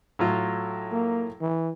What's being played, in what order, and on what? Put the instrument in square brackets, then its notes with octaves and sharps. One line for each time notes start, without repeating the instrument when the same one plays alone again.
[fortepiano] A2 F#3 F4
[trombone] A#3
E3